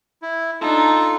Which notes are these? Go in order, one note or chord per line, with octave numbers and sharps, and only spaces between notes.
E4
D4 D#4 F4 A4